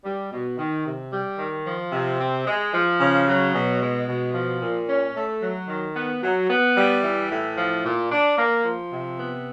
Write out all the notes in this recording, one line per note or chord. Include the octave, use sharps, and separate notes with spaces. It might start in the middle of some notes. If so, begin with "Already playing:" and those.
G3
B2
D#3
C3
G3
D#3
F3
C3
C4
G#3
F3
C#3
F#3
B2
G#3
B2
F3
A#2
C#4
A3
F#3
D#3
B3
F#3
B3
G3
E3
A2
F3
A#2
D4
A#3
F3
C3
B3